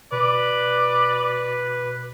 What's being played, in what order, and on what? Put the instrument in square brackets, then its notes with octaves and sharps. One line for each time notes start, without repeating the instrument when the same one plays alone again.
[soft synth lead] B2 [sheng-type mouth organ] B4 [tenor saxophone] D5